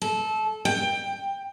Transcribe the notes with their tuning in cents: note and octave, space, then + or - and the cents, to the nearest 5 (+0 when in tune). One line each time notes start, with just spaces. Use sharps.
A4 -20
G5 +15